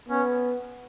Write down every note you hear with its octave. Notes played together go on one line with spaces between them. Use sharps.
B3 C#4